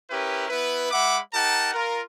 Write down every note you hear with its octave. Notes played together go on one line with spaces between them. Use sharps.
C#4 E4 G4 A#4 B4
B3 E4 B4
G#3 E5 F#5 B5 D6
D#4 G4 A#4 F#5 A5
F4 A#4